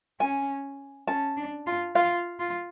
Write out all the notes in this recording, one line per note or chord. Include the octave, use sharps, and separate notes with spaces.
C#4 G#5
C#4 A5
D4
F4
F4 F5
F4